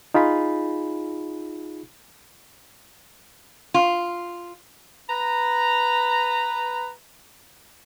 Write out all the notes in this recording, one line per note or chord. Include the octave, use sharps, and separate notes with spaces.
D#4 F4 G#4 B5
F4
B4 A#5